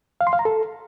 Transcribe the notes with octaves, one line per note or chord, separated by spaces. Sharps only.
F5
C6
F5
A#5
A4